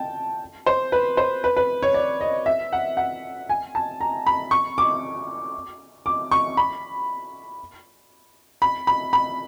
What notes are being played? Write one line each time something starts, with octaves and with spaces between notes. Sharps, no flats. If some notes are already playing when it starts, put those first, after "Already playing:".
Already playing: G5 A5
C5
B4
C5
B4
B4
C#5
D5
D#5
E5
F#5
F#5
G#5
A5
A#5
B5
C#6
D6
D6
C#6
B5
B5
B5
B5